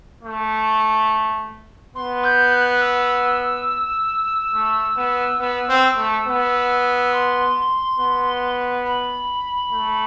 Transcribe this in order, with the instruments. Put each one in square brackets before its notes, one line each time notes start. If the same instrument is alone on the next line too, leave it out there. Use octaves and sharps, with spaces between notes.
[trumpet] A3
[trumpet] B3 [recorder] C6
[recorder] G6
F#6
E6
[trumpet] A3
B3
[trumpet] B3 [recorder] E6
[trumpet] C4
A3
B3
[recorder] C6
[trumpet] B3
[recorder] B5
[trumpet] A3